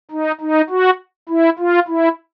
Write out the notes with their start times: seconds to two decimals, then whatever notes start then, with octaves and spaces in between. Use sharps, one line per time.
0.11 D#4
0.41 D#4
0.70 F#4
1.29 E4
1.59 F4
1.88 E4